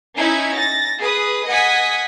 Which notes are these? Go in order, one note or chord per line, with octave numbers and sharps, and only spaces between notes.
C#4 D#4 E4 G#6
A6 A#6
G#4 B4 D#6
D#5 F#5 G#5 D#6 G#6 B6